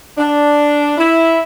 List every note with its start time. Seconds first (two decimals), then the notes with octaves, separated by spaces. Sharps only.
0.18 D4
0.98 E4